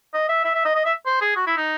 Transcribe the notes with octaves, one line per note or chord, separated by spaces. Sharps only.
D#5
E5
E5
E5
D#5
D#5
E5
C5
G#4
F#4
E4
D#4